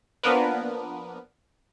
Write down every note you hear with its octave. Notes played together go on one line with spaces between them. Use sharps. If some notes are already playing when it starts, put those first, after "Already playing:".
F3 A#3 B3 D4 A#4 B4